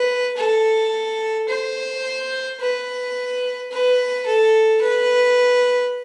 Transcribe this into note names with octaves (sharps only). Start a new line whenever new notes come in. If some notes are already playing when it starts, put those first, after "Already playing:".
Already playing: B4
A4
C5
B4
B4
A4
B4